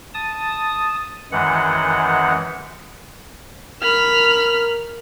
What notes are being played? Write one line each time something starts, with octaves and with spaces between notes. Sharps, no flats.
A5 D#6
F#2 D#3 E3 G#3 F#5
A#4 B5 F6